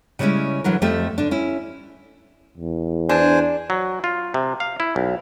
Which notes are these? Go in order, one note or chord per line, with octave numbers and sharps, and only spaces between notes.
C#3 G3 G#3 A#3 C#4 E4
D3 E3 F#3 A#4
F2 A3 F4 G4 E5
D3 D4
C#4 E4
E2
D4 C5 G#5
F#3
F4
C3
F5
E4
B1